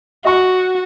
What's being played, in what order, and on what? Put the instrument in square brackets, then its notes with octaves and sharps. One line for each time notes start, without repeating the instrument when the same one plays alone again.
[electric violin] F#4 [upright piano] D#5 C#6